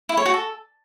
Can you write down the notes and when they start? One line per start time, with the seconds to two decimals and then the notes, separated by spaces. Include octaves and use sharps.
0.09 E4
0.17 C#5
0.26 F#4
0.34 A4